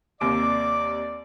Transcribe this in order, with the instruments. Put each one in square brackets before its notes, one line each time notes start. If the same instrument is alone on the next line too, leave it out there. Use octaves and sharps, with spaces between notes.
[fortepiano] D#2 C3 A#3 [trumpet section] D5 [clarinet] D6